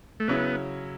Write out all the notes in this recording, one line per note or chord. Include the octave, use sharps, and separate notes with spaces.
A3
C#3 F#3 B3 C#4 E4